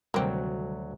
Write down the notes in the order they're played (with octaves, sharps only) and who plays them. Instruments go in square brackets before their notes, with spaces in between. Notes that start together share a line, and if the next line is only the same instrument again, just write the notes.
[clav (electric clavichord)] D2 F#3 [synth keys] C3 D#3 G3 [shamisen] A#3 C4